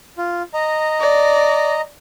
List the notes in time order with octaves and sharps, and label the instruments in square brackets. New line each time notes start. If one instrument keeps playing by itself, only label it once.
[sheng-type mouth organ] F4
D#5 A#5
[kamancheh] D5